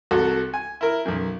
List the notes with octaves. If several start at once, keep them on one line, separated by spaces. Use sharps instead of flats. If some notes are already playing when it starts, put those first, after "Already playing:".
C2 F#4 A4
G#5
E4 A#4
B1 F#2